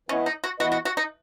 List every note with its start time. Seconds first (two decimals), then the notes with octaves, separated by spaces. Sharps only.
0.09 E3 B3 C#4 E4 B4 D#5
0.26 D#4
0.44 F#4
0.60 E3 B3 E4 F#4 B4 D#5
0.72 F#4
0.85 F#4
0.97 D#4